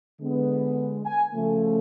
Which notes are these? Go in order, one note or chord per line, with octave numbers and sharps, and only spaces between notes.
D3 G#3 B3
G#5
C#3 F3 A3